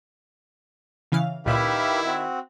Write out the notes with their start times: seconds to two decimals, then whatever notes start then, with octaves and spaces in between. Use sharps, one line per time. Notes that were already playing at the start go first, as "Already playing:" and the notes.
1.12 C#3 E3 F5
1.46 C#2 A#2 D#3 E4 G4 B4 F5
2.06 C4 F#4